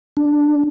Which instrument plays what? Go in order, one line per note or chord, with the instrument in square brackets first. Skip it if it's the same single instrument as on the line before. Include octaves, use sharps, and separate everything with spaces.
[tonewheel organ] D4